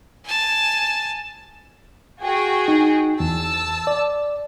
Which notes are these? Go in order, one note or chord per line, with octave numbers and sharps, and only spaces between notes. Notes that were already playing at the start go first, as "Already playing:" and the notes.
G#5 A5
F#4 G#4 G5
D#4
E2 A5 E6
D5